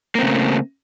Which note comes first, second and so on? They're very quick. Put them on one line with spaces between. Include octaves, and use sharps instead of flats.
A#3 C4 C#3 A3